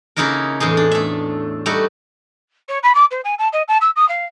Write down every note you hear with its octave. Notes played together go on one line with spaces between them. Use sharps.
C#3 A#3 D#4 E4 F#4 A#4
E2 A2 D#4 G#4
D4
A3 E5
G3 A3 D#4 F#4
C#5
B5
D6
C5
G#5
A5
D#5
A5
E6
D#6
F5